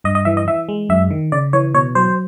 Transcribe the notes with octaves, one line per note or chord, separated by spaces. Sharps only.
G2 D#5
D#5
E3 E5
D#5
E3 E5
G#3
F#2 E5
D#3
C#3 D5
E3 C#5
B2 C#5
F#3 C5